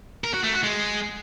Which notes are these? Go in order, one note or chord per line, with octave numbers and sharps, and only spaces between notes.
A#4
F#4
A3
F#4
G#3